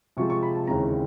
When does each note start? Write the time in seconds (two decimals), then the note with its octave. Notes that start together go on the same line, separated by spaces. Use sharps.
0.17 C3 F3 G#3 C#6
0.30 C#6
0.43 B5
0.55 A5
0.67 D#2 C#3 E3 G#3 C4 A#5